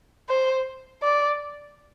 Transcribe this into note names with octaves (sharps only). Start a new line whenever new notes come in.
C5
D5